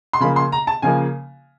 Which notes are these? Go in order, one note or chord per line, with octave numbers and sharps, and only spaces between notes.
C6
C#3 F3 A#3 B5
C6
A#5
A5
C#3 F3 A#3 G#5